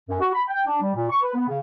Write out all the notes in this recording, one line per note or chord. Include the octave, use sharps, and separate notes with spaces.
F#2
F#4
B5
G5
D4
G3
A#2
C#6
B4
B3
C#3